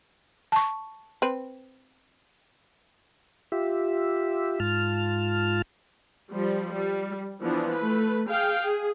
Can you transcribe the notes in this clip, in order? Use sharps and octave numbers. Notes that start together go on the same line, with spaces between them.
A5 C#6
C4 B4
F4 G4 E5
G#2 F4 A5 F6
F3 G3
G3
E3 F3 B3 D4
A3 B4
G#4 F5 G5
G#4